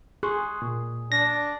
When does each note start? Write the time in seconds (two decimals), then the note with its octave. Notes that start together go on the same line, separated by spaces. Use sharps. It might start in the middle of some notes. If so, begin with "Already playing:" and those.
0.23 G#4 C6 C#6 F#6
0.62 A#2
1.12 D4 A#6